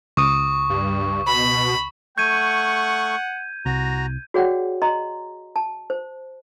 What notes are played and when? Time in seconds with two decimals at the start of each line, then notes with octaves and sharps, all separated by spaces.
0.17 C#2 C#6 D#6
0.70 G2
1.27 B2 B5
2.18 A3 F#5 C#6 G6 G#6 D#7
3.66 C2 F#4 A#5
4.34 F#4 G#4 C#5 D5 F#5 G5
4.82 D#5 A#5 C6
5.56 A5
5.90 C5